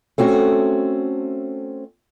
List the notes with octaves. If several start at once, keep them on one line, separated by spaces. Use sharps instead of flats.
A3 C4 C#4 F#4